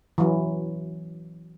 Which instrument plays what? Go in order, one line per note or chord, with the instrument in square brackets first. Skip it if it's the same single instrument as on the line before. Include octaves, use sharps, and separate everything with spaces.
[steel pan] E3 F#3